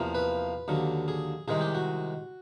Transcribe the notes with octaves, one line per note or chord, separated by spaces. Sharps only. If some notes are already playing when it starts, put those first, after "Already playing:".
Already playing: E2 C3 F3 A#3
B4
D#2 D3 F#3
G#4
C2 C3 D#3 G#3 G#4
G4
F#4